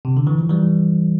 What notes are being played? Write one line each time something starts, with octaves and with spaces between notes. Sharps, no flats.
C3
D3
E3
F3
E3 G3